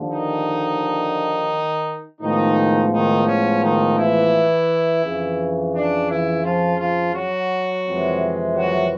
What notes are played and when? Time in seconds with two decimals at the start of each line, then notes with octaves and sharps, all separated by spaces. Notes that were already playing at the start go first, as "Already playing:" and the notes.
Already playing: D#2 D3 F3
0.10 D#3 D#4
2.21 A2 D#3 F3 G#3 B3 D#4
2.92 D#3 D#4
3.27 C#4
3.62 D#3 D#4
3.97 E3 E4
5.03 F2 C#3 E3
5.74 D4
6.09 E3 E4
6.44 F3 F4
6.79 F3 F4
7.14 F#3 F#4
7.85 F2 C3 E3 G#3 C4
8.56 F#3 F#4